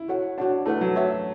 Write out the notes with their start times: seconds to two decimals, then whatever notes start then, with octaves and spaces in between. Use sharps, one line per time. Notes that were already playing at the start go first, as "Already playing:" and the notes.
Already playing: E4
0.08 F#4 A4 C#5 F#5
0.38 D4 F#4 C#5 F#5 A5
0.66 A3 E4 B4 F#5
0.81 F#3
0.96 F#4 C#5 E5